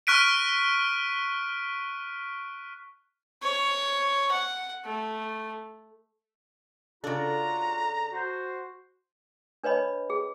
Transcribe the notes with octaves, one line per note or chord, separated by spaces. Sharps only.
C#6 F6 F#6 B6 D7 D#7
C#5
F#5
A3
C#3 D4 F4 F#4 A4 A#5
F#4 C5
D4 B4 C#5 D#5 B5
G#4